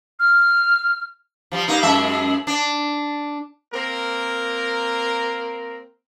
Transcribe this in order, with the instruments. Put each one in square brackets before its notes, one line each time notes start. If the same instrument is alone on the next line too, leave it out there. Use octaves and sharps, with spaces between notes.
[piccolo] F6
[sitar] F3 G3
G3 A#3 D#4
F#2 G#3 E5
D4
[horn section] A#3 C4 A#4